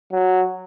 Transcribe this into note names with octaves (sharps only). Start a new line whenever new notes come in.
F#3